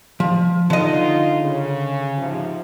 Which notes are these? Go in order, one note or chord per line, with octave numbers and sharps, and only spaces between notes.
F3
D3 D#4 F4 D#5
C#3
G#2 C3 F3